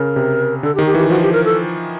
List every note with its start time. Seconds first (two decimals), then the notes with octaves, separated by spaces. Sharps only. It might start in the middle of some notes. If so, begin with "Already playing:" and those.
Already playing: C#3 A#4
0.16 C3
0.63 D3 A4
0.75 G4
0.79 D#3
0.86 G4
0.94 E3
0.98 G4
1.10 F3 F#4
1.22 G4
1.33 A#4
1.45 A4